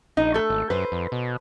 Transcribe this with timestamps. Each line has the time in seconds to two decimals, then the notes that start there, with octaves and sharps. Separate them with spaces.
0.17 A#1 D#4
0.34 A3 A4
0.50 G#1
0.70 F#2 B4 C5
0.92 F2
1.12 B2